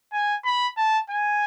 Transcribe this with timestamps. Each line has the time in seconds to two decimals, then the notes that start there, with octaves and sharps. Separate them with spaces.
0.13 G#5
0.45 B5
0.77 A5
1.10 G#5